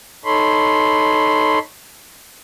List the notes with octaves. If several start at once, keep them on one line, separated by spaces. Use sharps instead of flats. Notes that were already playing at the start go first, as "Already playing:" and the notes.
D#4 A4 C#5 B5 C6